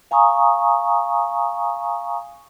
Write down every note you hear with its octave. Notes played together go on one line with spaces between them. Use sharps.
F5 G#5 A#5 C#6 D#6